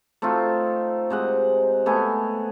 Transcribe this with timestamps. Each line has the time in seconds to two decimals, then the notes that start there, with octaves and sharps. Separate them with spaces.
0.22 A3 C4 D#4 F4
1.10 C3 G#3 F#5
1.86 A3 B3 G#5